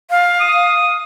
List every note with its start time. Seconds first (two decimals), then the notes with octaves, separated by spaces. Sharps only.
0.10 F5
0.40 D#6